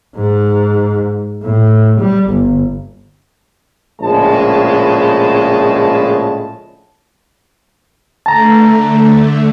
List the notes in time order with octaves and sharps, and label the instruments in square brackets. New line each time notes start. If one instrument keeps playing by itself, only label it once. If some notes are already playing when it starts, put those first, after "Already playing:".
[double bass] G#2
A2
G3
G1
[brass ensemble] A#1 A2 C#3 G#3 A5
[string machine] D3 A3 [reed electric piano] A5 A#5